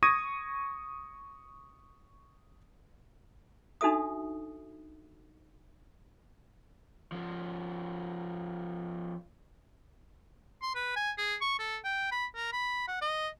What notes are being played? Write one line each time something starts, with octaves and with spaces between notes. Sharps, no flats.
C#6 D#6 G#6 A#6 D#7
D4 D#4 F#4 A4 E5 D#6
F3 C#4
C6
B4
G#5
G#4
C#6
A4
G5
B5
A#4
B5
F#5
D#5